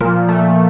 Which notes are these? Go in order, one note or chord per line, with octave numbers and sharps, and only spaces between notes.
A#2 F3
A3